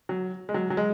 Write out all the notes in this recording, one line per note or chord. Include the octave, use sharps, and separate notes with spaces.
F#3
G#3
F#3
F#3
G#3